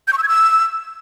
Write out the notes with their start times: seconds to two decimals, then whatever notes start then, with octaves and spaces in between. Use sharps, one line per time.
0.08 G6
0.13 C#6
0.18 E6
0.23 G#6
0.28 E6